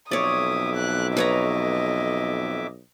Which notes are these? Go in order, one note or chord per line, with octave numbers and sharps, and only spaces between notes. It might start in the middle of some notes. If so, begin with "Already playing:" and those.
B1 F2 C#5 D5 E5 D6 D#6
F#6
B4 C#5 D#5 A#5